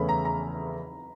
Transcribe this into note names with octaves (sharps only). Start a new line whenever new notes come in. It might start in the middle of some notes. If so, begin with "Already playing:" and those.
Already playing: E2 C#3 E3 A3 C#4 B5
A#5
A#5